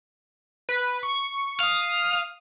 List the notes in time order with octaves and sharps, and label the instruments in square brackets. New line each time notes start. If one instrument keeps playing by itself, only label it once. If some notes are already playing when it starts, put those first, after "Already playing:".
[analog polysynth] B4
C#6
[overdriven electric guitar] F5 [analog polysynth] D#6 F6